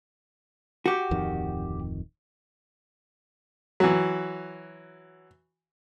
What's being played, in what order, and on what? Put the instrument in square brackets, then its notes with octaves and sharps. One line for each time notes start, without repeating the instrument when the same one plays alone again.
[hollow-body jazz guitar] F#4 G4
[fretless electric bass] D1 F2 D#3
[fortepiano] E3 F#3